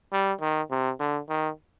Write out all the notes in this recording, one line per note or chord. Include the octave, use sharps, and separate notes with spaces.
G3
D#3
C3
D3
D#3